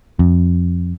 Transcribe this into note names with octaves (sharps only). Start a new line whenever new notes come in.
F2